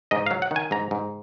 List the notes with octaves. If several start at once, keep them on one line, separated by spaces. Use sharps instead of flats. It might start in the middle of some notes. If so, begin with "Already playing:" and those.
G#2 D#5
F5
F#3
F#5
D#3
G#5
G#2 A#5
G#2